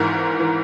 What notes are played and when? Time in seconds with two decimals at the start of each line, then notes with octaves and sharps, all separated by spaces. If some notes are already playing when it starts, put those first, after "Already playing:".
Already playing: G#1 G#2 E3 A#4
0.40 E3